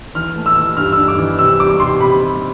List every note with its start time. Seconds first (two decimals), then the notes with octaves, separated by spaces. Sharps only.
0.15 E3 F6
0.36 A3
0.46 E6
0.57 E3
0.76 G2 F6
0.92 G2 E6
1.08 D6
1.18 E3
1.39 C3 E6
1.59 G3 D6
1.80 C3 C6
2.00 C3 B5
2.21 G3